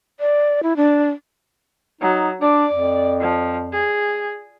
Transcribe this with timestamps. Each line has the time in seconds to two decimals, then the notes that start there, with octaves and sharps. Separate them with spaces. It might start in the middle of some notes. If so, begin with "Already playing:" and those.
0.20 D5
0.63 E4
0.77 D4
2.01 F#3 D#4
2.41 D4 D5
2.73 F2
3.20 F3
3.73 G#4